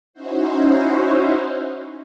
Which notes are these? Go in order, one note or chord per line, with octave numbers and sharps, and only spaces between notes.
C#4 D#4 E4 F#4 C5